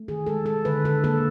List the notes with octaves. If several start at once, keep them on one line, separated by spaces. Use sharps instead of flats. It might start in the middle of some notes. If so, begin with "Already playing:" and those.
Already playing: A3
D#3 G#4
G#3 A4
G#3 A4
D3 B4
D3 A4
A#3 A4